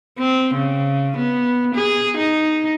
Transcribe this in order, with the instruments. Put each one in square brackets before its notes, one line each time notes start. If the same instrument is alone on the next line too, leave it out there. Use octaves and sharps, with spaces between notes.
[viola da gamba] C4
C#3
B3
G#4
D#4